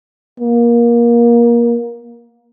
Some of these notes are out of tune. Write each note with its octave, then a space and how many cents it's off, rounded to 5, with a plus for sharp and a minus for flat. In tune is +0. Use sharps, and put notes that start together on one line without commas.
A#3 +20